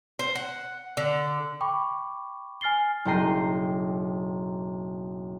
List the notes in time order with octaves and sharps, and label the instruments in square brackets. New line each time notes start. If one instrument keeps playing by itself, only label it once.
[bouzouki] C5
F#5
D3
[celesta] G5 B5 C#6 D6
G#5 F6 A6 C7 G7
[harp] F#1 B1 G5 A#5 C7 D#7